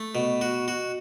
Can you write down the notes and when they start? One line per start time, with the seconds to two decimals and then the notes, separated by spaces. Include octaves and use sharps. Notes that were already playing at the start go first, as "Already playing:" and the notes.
Already playing: A3
0.15 B2
0.41 F#4
0.68 F#4